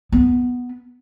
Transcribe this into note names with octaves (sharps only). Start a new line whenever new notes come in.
B3